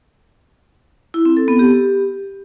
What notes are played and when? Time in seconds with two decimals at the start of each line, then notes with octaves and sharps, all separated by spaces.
1.14 E4
1.25 C4
1.37 A4
1.48 B3
1.59 G4